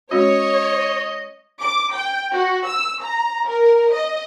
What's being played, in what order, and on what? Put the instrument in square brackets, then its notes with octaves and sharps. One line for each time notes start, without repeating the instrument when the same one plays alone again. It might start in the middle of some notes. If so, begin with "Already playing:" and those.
[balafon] G#3 C#4 F#4 [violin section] C#5 [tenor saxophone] D#5
[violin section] D6
G5
F#4
E6
A#5
A#4
D#5